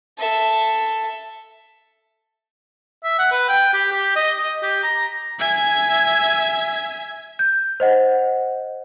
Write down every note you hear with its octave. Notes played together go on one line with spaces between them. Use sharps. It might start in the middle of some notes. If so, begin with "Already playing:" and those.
A4 E5
E5
F#5
B4
G5
G4
G4
D#5
D#5
G4
A#5
E5 G#5
G6
C5 D#5 F#5